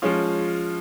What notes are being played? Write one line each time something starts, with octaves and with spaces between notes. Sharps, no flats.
F3 G#3 C#4 F4